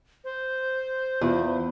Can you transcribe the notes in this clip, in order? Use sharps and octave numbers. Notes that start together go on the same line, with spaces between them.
C5
E2 B3 E4 F4